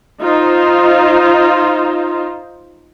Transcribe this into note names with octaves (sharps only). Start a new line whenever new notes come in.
D#4 F4 C5